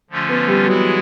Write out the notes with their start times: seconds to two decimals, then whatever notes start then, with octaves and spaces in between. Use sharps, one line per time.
0.10 D3 F3 A3 C#4 F4
0.29 B3
0.48 G3
0.67 E3 F#3 G#3 B3 E4 G#4